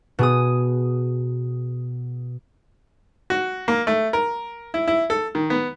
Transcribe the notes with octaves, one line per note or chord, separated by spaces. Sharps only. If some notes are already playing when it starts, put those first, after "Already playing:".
B2 G#4 D#6
F#4
A#3
A3
A#4
E4
E4
A4
D#3
B3